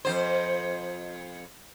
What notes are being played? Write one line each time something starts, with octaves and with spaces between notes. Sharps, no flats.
F2 C#3 C5